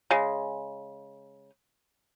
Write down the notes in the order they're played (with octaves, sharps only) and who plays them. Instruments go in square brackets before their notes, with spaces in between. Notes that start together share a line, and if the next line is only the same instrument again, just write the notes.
[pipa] C#3 G#3